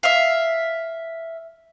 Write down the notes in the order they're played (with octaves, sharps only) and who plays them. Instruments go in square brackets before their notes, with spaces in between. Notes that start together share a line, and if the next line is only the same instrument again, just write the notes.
[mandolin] E5 F5